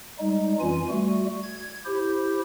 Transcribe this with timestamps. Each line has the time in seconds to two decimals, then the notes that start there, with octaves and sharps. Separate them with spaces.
0.19 G3 G#3 D#4
0.60 F2 E3 C#4 F4 G#5
0.89 G3 A3 F#4
1.43 G#6
1.85 E4 G4 C5